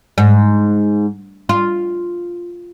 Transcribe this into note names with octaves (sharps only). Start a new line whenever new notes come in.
G#2
F4